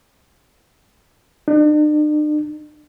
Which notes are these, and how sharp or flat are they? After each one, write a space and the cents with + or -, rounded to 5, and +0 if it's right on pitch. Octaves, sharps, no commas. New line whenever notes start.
D4 +45